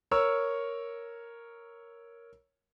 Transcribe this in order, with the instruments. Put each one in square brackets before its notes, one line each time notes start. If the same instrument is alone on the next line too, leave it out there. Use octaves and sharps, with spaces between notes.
[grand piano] A#4 C#5 C#6 E6